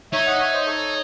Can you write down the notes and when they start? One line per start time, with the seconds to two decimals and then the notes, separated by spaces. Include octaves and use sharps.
0.12 D#4 C#5 E5
0.27 D#5 F#5
0.40 C#5 E5
0.53 C5 D#5
0.66 A4 C#5